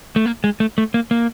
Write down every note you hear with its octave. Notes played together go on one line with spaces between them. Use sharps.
A3
A#3
G#3
A3
A3
A#3
A#3